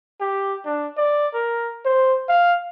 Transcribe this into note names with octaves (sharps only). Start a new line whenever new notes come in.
G4
D4
D5
A#4
C5
F5